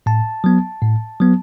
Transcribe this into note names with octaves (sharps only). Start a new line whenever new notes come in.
A2 A5
F#3 B3
A2
F#3 B3